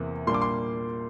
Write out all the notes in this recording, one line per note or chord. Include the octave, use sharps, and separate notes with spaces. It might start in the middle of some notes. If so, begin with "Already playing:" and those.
Already playing: E2 C3 E3 A#3
A#2 G3 A#3 D4 C6
D6
C6